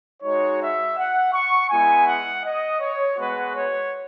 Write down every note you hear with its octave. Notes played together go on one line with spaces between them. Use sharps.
G#3 D#4 F#4 C#5
E5
F#5
C#6
G#3 B3 E4 G#5
F#5
D#5
C#5
G#3 B3 F#4 B4
C#5